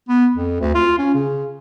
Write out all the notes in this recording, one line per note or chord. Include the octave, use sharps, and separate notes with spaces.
B3
F2
D2
F4
C#4
C#3